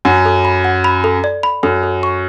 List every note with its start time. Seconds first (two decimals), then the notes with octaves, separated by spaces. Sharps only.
0.05 F#2 F#5
0.25 A4
0.45 B5
0.65 F#5
0.84 B5
1.04 A4
1.24 D5
1.43 B5
1.63 F#2 A4
1.83 A4
2.03 C#6